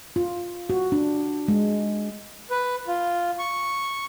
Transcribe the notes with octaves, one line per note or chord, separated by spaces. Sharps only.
F4
F#4
D4
G#3
B4
F4
C#6